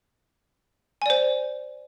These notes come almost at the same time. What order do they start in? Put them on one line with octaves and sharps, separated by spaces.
G#5 D5 C5